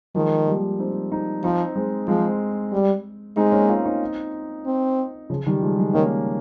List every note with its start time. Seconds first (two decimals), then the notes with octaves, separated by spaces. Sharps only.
0.15 D#3 F3 G#3
0.46 G3 A#3
0.79 C4 D#4
1.11 C4 D#4
1.43 F3 C4 D#4
1.76 G#3 C4
2.08 F3 G#3 C4
2.72 G3
3.37 G#3 C4 D#4
3.52 A#3 C#4
3.69 C#4 F4
3.84 C4 D#4
4.66 C4
5.30 C#3 F3
5.46 D#3 G3
5.62 F3 G#3
5.78 F3 G#3
5.94 D#3 A#3 C#4